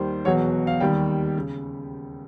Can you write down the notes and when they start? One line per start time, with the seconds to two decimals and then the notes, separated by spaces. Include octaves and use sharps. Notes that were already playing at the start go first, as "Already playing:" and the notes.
Already playing: D#2 D#3 G3 C5
0.25 E1 E2 B2 F#3 C#5
0.67 F5
0.80 D#2 D#3 G3 G5
1.37 C#3